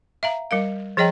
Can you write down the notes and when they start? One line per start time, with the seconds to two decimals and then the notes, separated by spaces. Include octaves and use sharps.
0.23 E5 F5 A#5
0.51 G3 A#4 F5
0.97 F3 G#4 C#5 D#5 G5 A#5